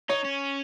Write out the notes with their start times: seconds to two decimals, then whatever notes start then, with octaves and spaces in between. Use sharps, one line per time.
0.09 D#4 C#5
0.24 C#4